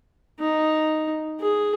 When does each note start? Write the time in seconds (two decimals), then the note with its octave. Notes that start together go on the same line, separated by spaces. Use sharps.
0.39 D#4
1.40 G#4